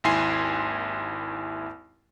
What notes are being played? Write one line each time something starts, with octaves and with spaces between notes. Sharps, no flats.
G#1 D#2 E4 G#5 C6 C7